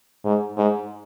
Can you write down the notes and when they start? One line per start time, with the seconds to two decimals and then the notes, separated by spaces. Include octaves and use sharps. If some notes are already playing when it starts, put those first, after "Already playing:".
0.25 G#2
0.57 G#2